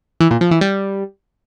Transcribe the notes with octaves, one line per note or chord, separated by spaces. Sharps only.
E3
A#2
F3
E3
G3